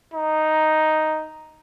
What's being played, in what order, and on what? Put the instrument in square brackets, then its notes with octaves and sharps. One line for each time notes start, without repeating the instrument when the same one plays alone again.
[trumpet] D#4